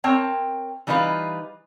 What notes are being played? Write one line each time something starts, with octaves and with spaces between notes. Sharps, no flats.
C4 A#4 C#5 G5 A5
E3 G3 D#4 F4 B4 F5